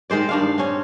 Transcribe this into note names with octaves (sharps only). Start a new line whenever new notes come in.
D#3 G#3 C5 D5
G2 D4 F5
C4 C#4